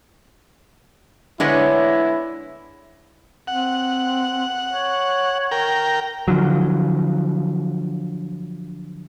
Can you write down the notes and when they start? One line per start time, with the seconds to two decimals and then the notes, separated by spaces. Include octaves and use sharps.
1.40 D3 G#3 B3 D4 E4 C#5
3.47 C4 F#5
4.69 C#5
5.51 A#4 G5
6.28 D3 F3 F#3